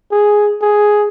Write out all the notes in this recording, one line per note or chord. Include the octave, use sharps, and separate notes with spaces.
G#4
G#4